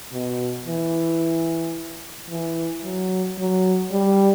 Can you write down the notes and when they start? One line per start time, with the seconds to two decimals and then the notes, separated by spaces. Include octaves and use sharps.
0.13 B2
0.67 E3
2.30 E3
2.84 F#3
3.38 F#3
3.92 G3